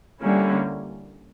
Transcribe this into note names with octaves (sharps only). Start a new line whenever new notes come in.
D3 G3 A#3 C#4 E4